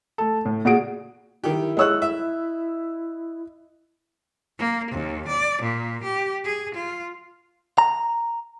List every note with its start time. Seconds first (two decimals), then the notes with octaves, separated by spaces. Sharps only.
0.18 A3 A4
0.45 A2
0.65 A#2 F#4 G#4 D7
1.44 D#3 E4 G4
1.77 G#3 C#5 D#5 E6 F#6
2.02 E5
4.59 A#3
4.91 D#2
5.27 D5
5.62 A#2
6.03 G4
6.44 G#4
6.75 F4
7.78 A#5